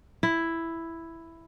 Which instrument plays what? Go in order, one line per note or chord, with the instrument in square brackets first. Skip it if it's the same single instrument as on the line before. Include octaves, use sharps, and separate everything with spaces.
[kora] E4